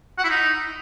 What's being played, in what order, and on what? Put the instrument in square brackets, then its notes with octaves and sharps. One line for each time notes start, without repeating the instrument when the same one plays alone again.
[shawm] F#5
E4
D#4